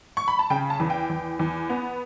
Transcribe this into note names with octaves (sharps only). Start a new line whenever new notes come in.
C#6
B5
A5
C#3 G5
A5
E2
G5
E2
E2
B3